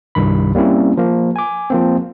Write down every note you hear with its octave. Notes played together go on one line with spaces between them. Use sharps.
C2 G2 D#3 B5
G3 A#3 C4 C#4 E4
F3 A#3
G#5 D6
F3 A#3 C4